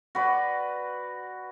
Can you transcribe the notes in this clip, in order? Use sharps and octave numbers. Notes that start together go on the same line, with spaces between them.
F#4 B4 D5